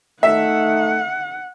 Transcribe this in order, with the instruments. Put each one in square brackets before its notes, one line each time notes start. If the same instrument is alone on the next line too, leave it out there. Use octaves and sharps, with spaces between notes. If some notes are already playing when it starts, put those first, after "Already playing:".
[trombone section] A3 D#4 [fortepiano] E5 [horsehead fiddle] F#5